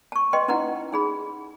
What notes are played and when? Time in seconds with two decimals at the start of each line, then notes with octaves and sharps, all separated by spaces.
0.12 A5 C#6
0.33 B4 D#5 G5 C6
0.48 C#4 D#4 E4 B4 F#5 A#5
0.92 D#4 G#4 B5